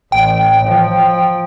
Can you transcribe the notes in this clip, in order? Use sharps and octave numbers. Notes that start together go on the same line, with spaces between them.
A1 G5
F3